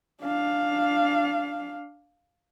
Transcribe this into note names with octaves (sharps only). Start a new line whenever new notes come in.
D4 F5